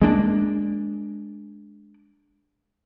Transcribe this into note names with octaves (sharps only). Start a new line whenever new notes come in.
G#3 A#3 D4